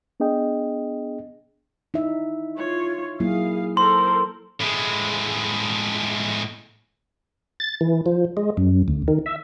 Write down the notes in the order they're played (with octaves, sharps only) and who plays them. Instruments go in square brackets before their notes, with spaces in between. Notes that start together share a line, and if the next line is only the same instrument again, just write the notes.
[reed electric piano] B3 D4 G#4 D#5 G5
[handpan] D#4 E4 E5
[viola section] F4 C#5
[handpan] F#3 A#3 E4 [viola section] G#4 F5
[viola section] A4 A#4 C5 [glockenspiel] C6
[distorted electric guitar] A2 G#3
[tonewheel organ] A6
E3
F3
G#3
F#2
D2
D#3
E5